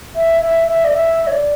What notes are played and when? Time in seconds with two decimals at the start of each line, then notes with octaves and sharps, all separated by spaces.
0.16 E5
0.41 E5
0.68 E5
0.84 D5
0.94 E5
1.27 C#5
1.32 D5